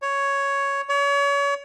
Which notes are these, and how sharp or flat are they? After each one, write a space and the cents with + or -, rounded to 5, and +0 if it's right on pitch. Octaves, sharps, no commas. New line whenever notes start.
C#5 +5
C#5 +35